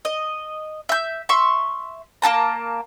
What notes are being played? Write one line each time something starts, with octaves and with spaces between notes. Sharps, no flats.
D#5
E5 G6
E5 C6 C#6
A#3 F4 A5 A#5